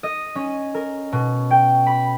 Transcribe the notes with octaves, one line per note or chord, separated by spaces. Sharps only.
D#5
C#4
A#4
B2
G5
B5